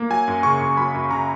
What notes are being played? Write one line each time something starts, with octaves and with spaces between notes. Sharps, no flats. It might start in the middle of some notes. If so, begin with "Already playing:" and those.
Already playing: A#3
F#3 G#5
F#2
C#3 C#6
F#2
F#3 B5
F#2
C#3 A#5